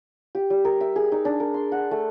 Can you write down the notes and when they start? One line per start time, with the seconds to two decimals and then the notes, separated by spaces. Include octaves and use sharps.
0.35 G4
0.50 G3
0.65 A#4
0.81 E5
0.96 G#4
1.12 D#4
1.25 D4
1.40 A#4
1.54 C6
1.72 F#5
1.91 A3